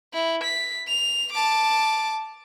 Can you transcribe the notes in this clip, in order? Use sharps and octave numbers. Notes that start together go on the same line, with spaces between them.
E4
B6
F7
A5 D6